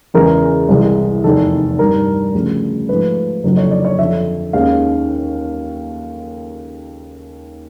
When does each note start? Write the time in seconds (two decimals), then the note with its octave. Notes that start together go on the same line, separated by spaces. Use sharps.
0.14 E2 C#3 E3 G#3 A#4
0.69 C2 C3 E3 G#3
1.24 F1 E2 C3 D#3 A4
1.79 G2 D#3 G3 A#4
2.34 D2 C#3 F3
2.89 G#2 F3 A3 B4
3.44 F#1 F2 D3 F#3
3.57 C#5
3.71 D5
3.85 C#5
3.99 F2 D3 F3 E5
4.53 D#2 D#3 G#3 C#4 F5